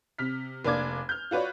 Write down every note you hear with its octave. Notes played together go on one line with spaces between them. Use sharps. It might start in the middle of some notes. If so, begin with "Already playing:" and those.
C3 F6 B6
F1 A#3 D4 D6 G#6
F6 G6
F4 F#4 B4 C#5 D5